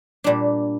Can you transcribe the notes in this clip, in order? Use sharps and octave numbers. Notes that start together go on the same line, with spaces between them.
A#2 G3 D4